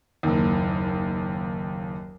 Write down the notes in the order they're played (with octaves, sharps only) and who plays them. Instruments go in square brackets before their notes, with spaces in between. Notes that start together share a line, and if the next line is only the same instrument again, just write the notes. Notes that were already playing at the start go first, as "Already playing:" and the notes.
[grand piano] F#1 D#2